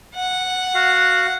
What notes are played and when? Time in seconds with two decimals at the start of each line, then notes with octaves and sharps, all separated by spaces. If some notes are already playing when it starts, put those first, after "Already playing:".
0.15 F#5
0.74 F#4 F5